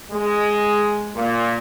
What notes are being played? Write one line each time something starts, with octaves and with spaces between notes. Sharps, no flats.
G#3
A#2